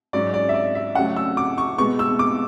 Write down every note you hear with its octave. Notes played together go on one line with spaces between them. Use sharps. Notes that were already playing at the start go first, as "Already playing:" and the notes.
G#2 F#3 C#4 D5
D5
E5
D5
E5
C#3 F#3 A3 C#4 F#5
E6
D6
C#6
B2 G#3 B3 C#6
E6
D6